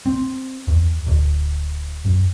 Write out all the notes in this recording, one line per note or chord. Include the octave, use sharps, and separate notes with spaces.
C4
E2
D1
F#2